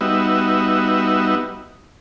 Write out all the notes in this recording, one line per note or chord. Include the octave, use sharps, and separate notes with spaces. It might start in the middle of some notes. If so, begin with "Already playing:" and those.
G3 B3 D#4 F#4 E5